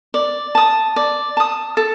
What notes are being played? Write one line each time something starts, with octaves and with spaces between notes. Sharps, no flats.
D5
A5 D#6
D5
A5 D#6
A4